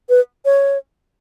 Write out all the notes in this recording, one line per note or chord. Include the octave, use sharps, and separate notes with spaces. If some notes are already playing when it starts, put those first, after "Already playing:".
B4
C#5